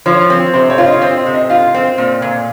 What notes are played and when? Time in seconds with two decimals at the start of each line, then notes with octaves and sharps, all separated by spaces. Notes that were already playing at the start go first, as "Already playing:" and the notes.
0.06 F3 C#5
0.30 C4
0.54 C3 C5
0.70 C#5
0.78 F4
0.86 D#5
1.02 C4 D#5
1.17 D#5
1.26 C3
1.34 D#5
1.50 F4 F5
1.74 C4
1.98 A#2
2.22 A#2